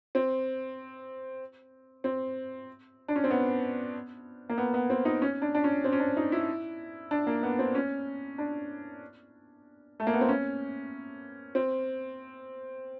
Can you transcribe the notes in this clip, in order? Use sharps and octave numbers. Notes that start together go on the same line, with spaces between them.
C4
C4
D4
C#4
C4
B3
A#3
B3
B3
C4
D#4
C#4
D4
D4
C#4
C4
C#4
D4
D#4
E4
D4
A#3
B3
C4
C#4
D4
A3
A#3
B3
C4
C#4
C4